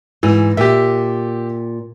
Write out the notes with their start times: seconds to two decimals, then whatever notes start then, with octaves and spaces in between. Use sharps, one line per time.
0.23 G#2 E3
0.57 A#2 G4 E5